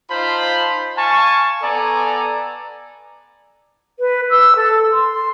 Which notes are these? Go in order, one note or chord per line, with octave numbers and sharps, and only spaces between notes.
D#4 F4 C5 A5 B5
F5 G#5 A5 C#6
B3 A4 D5 G#5 A#5
B4
E6
A4
C6